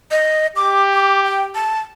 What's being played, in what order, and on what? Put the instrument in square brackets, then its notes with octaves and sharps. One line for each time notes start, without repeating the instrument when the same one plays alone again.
[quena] D#5
[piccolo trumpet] G4 [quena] D6
[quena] D6
G5
A5